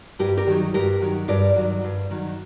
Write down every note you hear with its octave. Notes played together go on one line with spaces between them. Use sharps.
G2 G4 A#4
G4 A#4
D#3 F#3
G2 G4 A#4
D#3 F#3
G2 A#4 D5
D#3 F#3
G2
D#3 F#3